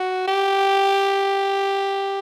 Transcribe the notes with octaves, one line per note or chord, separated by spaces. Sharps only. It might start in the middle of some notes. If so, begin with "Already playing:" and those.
Already playing: F#4
G4